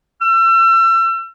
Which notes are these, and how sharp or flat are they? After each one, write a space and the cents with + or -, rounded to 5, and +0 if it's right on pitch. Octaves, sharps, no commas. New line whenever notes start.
E6 +35